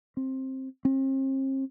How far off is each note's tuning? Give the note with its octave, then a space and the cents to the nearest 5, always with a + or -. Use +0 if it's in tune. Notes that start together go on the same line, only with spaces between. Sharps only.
C4 +15
C4 +40